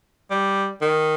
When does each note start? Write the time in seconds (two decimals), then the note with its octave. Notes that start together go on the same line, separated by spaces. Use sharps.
0.31 G3
0.81 D#3